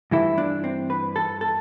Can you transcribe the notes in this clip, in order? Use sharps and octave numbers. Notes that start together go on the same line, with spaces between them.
G2 E3 A3 E4
D4
C4
B4
A4
A4